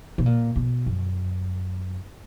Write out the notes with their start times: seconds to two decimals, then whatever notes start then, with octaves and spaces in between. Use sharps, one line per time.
0.18 B2
0.26 A#2
0.56 B2
0.86 F#2